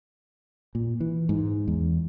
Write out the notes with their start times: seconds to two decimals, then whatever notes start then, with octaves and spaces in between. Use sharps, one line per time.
0.75 A#2
1.00 E3
1.29 G#2
1.68 E2